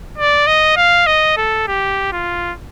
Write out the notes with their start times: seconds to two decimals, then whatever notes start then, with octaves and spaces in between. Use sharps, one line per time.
0.18 D5
0.47 D#5
0.77 F5
1.07 D#5
1.37 A4
1.67 G4
2.12 F4